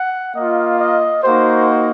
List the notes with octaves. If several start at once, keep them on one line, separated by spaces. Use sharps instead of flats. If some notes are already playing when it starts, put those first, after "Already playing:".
Already playing: F#5
A#3 F4 D#5
D#5
A#3 D#4 F#4 C5